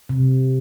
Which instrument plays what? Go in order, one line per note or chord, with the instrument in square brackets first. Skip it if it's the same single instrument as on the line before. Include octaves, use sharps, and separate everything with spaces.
[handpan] C3